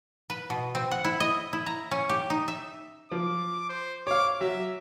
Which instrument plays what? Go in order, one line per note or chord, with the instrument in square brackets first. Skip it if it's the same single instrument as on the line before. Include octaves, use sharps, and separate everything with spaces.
[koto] B4
B2
C4
F#5
E4
D#5
E4
A#5
C#4
G4
D#4
E5
[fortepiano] F3 [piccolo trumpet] D6
[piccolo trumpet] C5
[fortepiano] C#5 F5 [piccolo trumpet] D6
[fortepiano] F#3 [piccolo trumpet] E5